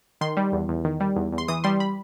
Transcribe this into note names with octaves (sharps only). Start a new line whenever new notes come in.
D#3 C6
G3
E2
E2
D#3
G3
E2
E2
C6
E3 D#6
G3 C6
B5